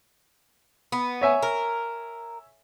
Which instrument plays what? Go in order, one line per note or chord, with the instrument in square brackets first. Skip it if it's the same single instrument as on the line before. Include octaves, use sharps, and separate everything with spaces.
[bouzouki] B3
[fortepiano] C#5 E5 G#5
[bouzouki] A#4